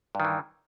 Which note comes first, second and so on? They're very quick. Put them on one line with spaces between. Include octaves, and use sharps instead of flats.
G2 D#3 E3